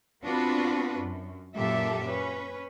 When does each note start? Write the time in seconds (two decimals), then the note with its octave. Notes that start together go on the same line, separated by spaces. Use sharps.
0.24 B3 C4 D4 F4 F#4 B4
0.98 F#2
1.55 F#2 A#2 A#3 G4 A4 E5
2.05 C#4 B4